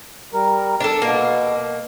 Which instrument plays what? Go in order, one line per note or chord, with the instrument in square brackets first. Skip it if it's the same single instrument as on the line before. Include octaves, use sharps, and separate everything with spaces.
[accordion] G3 A#4
[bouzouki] D4 A4
[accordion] B2 [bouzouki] A#3